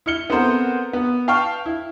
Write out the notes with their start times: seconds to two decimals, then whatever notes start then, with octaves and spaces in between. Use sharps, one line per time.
0.06 E4 F6 C#7 G7
0.30 B3 C4 A4 A#4 C5 F#5
0.93 B3
1.28 F5 G5 A5 C#6 F6
1.66 E4